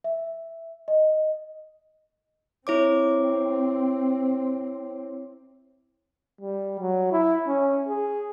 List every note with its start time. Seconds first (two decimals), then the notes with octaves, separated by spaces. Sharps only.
0.04 E5
0.88 D#5
2.67 C4 E4 C#5 D6
6.41 G3
6.80 F#3
7.12 E4
7.47 C#4
7.89 G#4